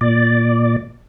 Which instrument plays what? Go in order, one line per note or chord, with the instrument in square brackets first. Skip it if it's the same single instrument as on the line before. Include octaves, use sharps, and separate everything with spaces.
[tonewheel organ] A#2 D5